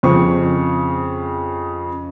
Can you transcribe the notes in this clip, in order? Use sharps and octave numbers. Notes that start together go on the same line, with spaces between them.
F2 C#3 C5 C#6